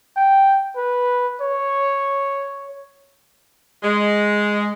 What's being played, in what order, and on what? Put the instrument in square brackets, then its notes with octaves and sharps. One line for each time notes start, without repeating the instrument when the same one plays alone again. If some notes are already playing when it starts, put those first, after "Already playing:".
[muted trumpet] G5
B4
C#5
[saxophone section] G#3